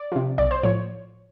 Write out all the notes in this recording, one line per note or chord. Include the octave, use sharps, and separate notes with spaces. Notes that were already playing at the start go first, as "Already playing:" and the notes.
Already playing: D5
C3 F3
B1 D5
C5
A2 F3 C#5